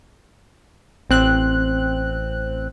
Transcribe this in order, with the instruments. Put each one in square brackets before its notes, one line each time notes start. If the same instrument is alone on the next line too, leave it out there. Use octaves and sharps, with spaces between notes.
[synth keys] A1 C4 F#6